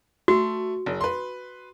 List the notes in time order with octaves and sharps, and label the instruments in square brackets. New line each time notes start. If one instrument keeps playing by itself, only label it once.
[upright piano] A3 [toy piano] F#4
[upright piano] F#1
B4 C6